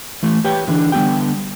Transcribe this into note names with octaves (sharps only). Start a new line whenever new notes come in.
E3 A3
G4 B4 C#5 G5
D3 E3 D4
D3 G3 B3 G4 G5